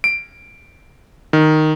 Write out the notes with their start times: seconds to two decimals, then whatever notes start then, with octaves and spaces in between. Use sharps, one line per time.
0.04 D7
1.33 D#3